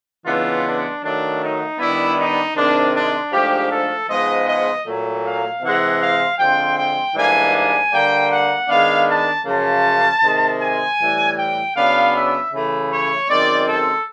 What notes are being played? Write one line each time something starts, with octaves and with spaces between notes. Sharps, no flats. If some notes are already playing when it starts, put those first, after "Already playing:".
C#3 E3 G#3 B3 D4 F4
D4
D#3 F#3 A3 D4
D#4
D#3 G3 B3 D4 E4
D#4
C3 D#3 G#3 C4 D4
D4
G#2 F3 A3 D4 G4
A4
G#2 F3 G#3 B3 D#5
D#5
A#2 F#3 A3
F5
C3 E3 G#3 F#5
F5
D3 F3 G#3 C4 G5
G5
G#2 E3 G3 A#3 D4 G#5
G#5
D3 G3 A#3 G5
F#5
D#3 G#3 B3 D4 F5
A5
F#2 C#3 F3 A#3 C#4 A5
C3 D#3 G#3
G#5
A2 E3 G3
G5
C#3 F#3 B3 D4 F5
E5
C#3 E3 A3
C#5
F#2 D#3 G#3 C4 D5
A4